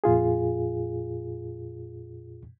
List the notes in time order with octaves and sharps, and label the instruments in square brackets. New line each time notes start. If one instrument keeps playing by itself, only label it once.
[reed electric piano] F2 A#2 F4 G#4